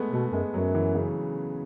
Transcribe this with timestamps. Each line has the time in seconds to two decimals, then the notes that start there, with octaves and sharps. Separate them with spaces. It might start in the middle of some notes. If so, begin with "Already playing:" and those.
Already playing: G#3 A3 B3
0.12 B2 A3
0.32 F#2 G#3
0.52 F#2 F#3
0.75 E3
0.95 C#3